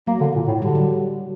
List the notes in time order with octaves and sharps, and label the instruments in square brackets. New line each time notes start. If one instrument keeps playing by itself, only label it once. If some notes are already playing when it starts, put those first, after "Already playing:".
[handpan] F#3 [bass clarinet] A#3
[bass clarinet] D3
A#2
A2
[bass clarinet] D3 [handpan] G3
[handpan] F#3